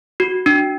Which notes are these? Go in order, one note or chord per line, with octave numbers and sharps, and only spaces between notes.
F#4
D4